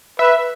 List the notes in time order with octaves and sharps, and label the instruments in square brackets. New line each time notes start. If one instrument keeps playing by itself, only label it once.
[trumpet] B4 [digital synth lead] E5